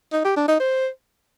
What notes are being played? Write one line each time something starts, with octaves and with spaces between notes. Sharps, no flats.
D#4
G4
D4
D#4
C5